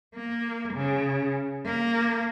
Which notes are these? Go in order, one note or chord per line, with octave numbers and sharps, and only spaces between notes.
A#3
C#3
A#3